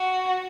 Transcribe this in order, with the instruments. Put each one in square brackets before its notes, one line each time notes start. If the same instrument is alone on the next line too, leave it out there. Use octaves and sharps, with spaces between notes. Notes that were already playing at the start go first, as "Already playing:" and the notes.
Already playing: [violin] F#4